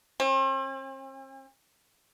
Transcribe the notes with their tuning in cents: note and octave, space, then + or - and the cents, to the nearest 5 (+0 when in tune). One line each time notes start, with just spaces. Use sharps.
C4 +45